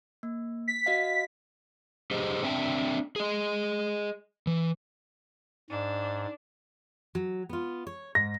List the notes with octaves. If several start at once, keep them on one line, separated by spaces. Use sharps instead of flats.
A#3
B6
F#4 D#5 F5
G4 G#4 C5 D#5
C4 D4 E5 F#5 G5
G#4 D#5
E3
G#2 D4
F#3
B3 F4
C#5
G#2 A#6